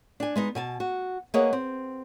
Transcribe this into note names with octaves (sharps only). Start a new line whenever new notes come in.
D4 G#5
G#3 B3 D#4
B2 G#5 A5
F#4
A#3 G#4 B4 C#5 D#5 F#5
C4